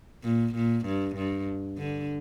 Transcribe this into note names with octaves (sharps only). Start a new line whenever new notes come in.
A#2
A#2
G2
G2
D3